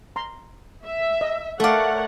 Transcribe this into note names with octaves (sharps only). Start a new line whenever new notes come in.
A#5 C6
E5
D#5
A3 A4 A#4 C#5 D5 F5 F#5